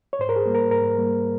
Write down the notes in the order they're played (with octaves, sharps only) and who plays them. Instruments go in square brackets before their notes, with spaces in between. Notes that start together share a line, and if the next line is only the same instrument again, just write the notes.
[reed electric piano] C#5
G#2 C5
A#4
G#4
G3 A#3
A#4
G#2 A#4
G3 A#3